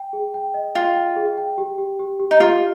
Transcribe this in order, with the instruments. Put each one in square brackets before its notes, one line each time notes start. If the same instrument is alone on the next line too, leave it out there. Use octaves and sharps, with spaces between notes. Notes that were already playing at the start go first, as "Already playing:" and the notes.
Already playing: [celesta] G5
G#4
G5
D#5
[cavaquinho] F4 [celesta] G5
[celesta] G5
G#4
G5
G4
G4
G4
G4
[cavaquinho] D#4
[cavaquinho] F4 [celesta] G4